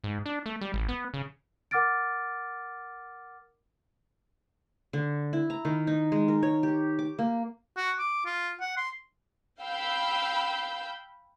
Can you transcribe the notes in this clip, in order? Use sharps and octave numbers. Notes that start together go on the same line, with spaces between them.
G#2
D4
A3
G3
A1
B3
C#3
A#4 F#5 D6 F6 A6 D7
D3
E4
A#5
D#3
D#4
G#3
A#4
C#5
G4
D6
A#3
F#4
D6
F4
F#5
C6
F5 G5 B5 E6 G6